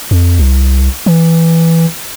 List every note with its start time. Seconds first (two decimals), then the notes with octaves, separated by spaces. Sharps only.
0.11 F2
0.39 C2
1.06 E3